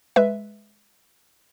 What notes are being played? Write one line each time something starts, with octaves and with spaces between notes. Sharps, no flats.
G#3 B4 E5